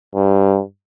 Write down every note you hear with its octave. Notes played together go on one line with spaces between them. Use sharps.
G2